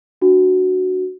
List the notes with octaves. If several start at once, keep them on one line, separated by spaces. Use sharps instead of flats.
D4 F#4